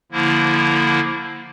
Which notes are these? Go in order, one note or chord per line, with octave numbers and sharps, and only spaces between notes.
D3 F3 A#3 E4